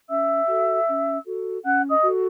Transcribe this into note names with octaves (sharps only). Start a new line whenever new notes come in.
C#4 E5 E6
F#4 A4
C#4
F#4 A4
C#4 F#5 F#6
D#5 D#6
F#4 A4